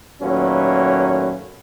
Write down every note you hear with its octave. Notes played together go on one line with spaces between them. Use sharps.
D#2 A#2 F#3 A3 C#4 B4